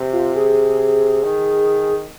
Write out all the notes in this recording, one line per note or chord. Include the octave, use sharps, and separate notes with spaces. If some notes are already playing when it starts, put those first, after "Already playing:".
Already playing: C3
F4
G#4
D#3